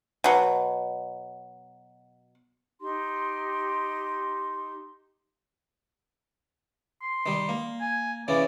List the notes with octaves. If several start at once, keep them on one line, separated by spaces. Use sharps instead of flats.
B2 F#3
D#4 G4 C6
C6
D#3 G3
A#3
G#5
C#3 E3 C#4 D5